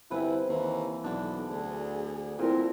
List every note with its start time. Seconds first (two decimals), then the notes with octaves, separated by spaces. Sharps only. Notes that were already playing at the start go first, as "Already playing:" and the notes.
0.11 G1 C3 E4 B4
0.49 D#2 E3
1.04 B1 D3 D4
1.50 D2 G#4
2.39 A#2 C4 E4 A#4